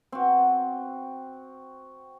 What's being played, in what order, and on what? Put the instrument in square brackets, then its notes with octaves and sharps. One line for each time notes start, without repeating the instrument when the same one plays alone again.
[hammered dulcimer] C4 F#4